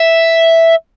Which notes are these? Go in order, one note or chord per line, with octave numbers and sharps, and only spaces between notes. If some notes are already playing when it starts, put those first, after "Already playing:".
Already playing: E5